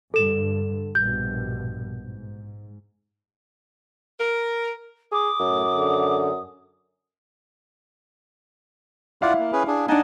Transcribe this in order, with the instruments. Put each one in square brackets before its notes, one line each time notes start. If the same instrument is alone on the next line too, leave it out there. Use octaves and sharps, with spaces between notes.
[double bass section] G2 D3 [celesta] A4 E7
[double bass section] A#1 G2 B2 [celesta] G6
[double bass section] G#2
[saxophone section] A#4
[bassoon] G#4 [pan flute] D6 [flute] D#6
[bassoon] F#2 [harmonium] A2
[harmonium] D3
[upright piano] E4 F5 [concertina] F4 D5 F#5
[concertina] A#3
C#4 G#4 B4
D4 G#4
[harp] D4 D#4 [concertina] F#5 G#5 A5